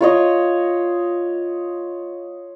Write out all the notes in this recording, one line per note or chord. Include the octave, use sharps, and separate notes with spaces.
F4 C#5 D#5